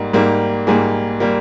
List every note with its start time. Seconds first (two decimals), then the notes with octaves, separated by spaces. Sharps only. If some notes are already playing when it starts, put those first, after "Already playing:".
Already playing: G#2 G3 A#3
0.13 G#2 G3 A#3
0.67 G#2 G3 A#3 G#4
1.20 G3 A#3